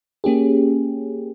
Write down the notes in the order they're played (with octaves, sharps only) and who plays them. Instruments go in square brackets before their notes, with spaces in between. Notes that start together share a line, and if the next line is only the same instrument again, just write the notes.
[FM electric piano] A#3 C#4 G4 G#4